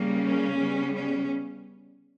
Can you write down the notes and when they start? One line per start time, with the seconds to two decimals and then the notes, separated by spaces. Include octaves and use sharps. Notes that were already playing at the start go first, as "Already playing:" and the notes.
Already playing: C#3 G3 A#3
0.23 C#4
0.58 C#3 G3 B3
0.94 C#4